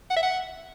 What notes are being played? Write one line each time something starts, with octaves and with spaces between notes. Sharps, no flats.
F#5
E5
F#5